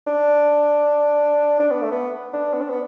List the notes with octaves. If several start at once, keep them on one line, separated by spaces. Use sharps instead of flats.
D4
D4
B3
A3
B3
D4
B3
D4
B3